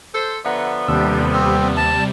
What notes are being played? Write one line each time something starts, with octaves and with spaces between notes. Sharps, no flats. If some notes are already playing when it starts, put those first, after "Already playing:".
A4 C5
D3 F3 B3 E5 F#5 A#5
D#2 C3 G3 D4 E6
C4
A5